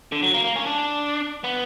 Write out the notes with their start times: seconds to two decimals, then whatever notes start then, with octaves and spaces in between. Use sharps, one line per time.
0.12 D3
0.23 F#3
0.34 A#3
0.44 A#3
0.56 C#4
0.66 D4
1.44 B3